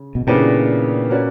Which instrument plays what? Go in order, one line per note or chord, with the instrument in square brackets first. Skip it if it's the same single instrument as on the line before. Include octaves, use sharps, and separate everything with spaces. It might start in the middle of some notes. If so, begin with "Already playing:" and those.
Already playing: [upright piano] C#3
[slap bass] B2
[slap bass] A#2 [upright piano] C#3 E3 B3 D4 G4
[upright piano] A#3 C#4 F#4 B4 D5